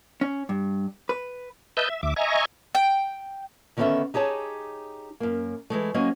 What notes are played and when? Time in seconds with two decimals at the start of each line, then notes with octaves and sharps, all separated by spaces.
0.21 C#4
0.49 G2
1.09 B4
1.77 B4 D#5 E5 A5 G6
1.90 E5
2.03 D2 E5 D6
2.16 D#5 E5 G#5 A#5 C#6
2.75 G5
3.77 D3 D#3 B3 C#4 A4 E5
4.14 D#4 G4 G#4 C#5 A5
5.20 F#2 A#3
5.70 E3 G#3 A3
5.94 F#3 A#3 C#4 C5 D#5